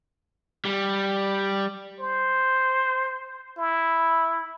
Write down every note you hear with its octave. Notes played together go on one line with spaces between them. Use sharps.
G3
C5
E4